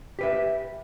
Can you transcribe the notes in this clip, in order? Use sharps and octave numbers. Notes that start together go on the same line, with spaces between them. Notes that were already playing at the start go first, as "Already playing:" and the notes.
G4 B4 E5